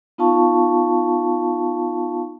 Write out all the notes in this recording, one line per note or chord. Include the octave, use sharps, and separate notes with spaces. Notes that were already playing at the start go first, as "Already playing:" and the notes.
B3 D#4 F4 F5 A5 C#6